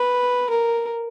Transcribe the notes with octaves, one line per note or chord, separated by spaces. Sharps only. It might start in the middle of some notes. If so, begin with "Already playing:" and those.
Already playing: B4
A#4